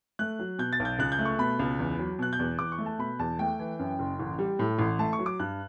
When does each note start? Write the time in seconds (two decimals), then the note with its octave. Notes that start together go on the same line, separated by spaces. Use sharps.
0.19 A3 F#6
0.39 F#3
0.59 B2 G6
0.73 A6
0.80 B1
0.85 G6
0.99 C#2 F#6
1.12 G6
1.19 A3
1.25 C#6
1.38 B2 B5
1.59 C#2
1.79 E2
1.99 F#3
2.19 B2 F#6
2.33 G6
2.39 E2
2.59 E2 D6
2.72 C#6
2.78 A3
2.86 A5
2.98 B2 B5
3.19 E2 A5
3.39 A3 G5
3.59 E3
3.79 F#2
3.99 F#1
4.20 A1
4.39 G3
4.59 A2
4.79 A1
4.99 A3 A5
5.13 C#6
5.19 F#3
5.26 D6
5.40 G2 F#6